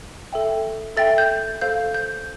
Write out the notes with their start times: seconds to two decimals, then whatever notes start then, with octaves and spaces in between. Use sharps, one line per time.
0.33 A4 E5 G5
0.97 A4 E5 G5 A6
1.18 G6
1.61 A4 C5 F5 G6
1.94 G6